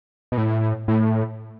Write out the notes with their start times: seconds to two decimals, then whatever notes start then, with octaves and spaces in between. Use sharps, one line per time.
0.32 B2
0.37 A2
0.88 A2